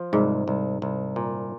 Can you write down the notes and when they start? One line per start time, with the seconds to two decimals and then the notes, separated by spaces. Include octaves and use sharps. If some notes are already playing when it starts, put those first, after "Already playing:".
Already playing: F3
0.13 C2 G#2
0.48 C2
0.82 C2
1.16 A#2